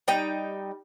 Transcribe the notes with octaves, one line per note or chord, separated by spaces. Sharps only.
G3 D#4 G5